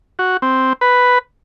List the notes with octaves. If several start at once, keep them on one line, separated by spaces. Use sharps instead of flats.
F#4
C4
B4